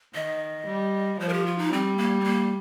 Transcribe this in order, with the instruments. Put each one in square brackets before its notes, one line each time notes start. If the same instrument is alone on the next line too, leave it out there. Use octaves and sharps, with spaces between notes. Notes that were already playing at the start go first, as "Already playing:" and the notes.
[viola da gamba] D#3 [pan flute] D#5
[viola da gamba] G3
[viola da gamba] F3 [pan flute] C5
[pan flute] A#4
G4
F4
D#4
[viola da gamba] G3 [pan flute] C4
[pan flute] A#3
C4
A#3